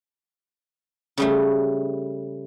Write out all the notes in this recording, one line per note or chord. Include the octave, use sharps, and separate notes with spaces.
C#3 G3 A3